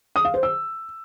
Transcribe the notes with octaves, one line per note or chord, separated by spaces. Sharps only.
D#6
F5
C5
E6